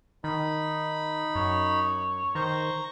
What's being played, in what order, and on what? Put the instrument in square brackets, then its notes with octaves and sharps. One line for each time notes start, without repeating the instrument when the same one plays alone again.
[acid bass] D#3 [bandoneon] D#4 B5
[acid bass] F#2 [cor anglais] C#5
[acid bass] D#3 [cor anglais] C5 [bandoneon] A#5 C#6